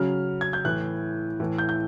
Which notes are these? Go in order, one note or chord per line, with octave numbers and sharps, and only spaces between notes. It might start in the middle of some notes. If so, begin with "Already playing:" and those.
Already playing: C#3 F#3 F6
G#6
G6
A2 E3 F#6
A2 E3
G6
G6